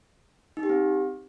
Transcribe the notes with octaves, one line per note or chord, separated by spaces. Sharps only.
D#4
G4
C4